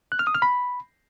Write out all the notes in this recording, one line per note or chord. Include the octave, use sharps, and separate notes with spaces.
F#6
F6
D#6
F6
B5